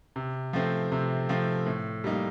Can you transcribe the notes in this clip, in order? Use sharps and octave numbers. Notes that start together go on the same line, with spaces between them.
C3
F3 A3 C4
C3
F3 A3 C4
A2
G3 A#3 D#4